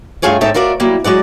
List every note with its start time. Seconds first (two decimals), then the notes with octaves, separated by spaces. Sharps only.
0.22 G2 A3 F4 G#4 C#5 G#5
0.41 G#2 D#4 A4 C#5 E5 G5
0.54 F4 F#4 A#4 D5 E5
0.80 F#3 G3 A#3 E4
1.04 F#3 G#3 D5 F#5